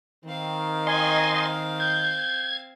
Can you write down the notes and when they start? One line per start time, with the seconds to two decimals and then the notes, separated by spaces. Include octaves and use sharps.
0.25 D#3 C4 F5
0.87 D#5 G#5 C6
1.80 G6 G#6